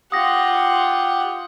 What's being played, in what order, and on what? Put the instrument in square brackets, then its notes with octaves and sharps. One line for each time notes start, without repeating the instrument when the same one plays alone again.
[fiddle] F4 F#5 [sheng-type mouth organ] G4 [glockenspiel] D#6 A#6